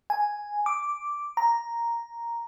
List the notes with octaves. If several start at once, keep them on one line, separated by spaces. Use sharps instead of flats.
G#5
D6
A#5